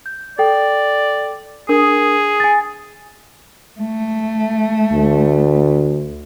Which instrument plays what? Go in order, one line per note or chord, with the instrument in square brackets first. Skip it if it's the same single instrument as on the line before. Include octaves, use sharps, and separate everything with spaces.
[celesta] G6
[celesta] A4 G5 [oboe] D5
[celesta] D4 A#4 D#6 [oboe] G#4
[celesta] G#5 A6
[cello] A3
[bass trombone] D2